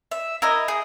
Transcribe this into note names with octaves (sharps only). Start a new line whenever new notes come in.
E5
E4 A#4 D#5
G#4